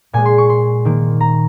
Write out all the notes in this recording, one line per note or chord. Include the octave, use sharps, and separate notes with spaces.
A#2 G#3 G#5
C6
C#6
C6
D#3 A#3
A#5